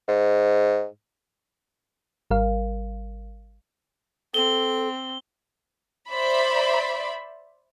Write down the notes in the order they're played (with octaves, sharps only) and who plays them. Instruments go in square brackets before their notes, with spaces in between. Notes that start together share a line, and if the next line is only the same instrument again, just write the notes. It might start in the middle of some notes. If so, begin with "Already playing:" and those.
[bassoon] G#2
[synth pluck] G#1 G3 A#4 F5
[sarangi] C4 [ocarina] A4 [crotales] G7
[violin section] C5 D5 E5 B5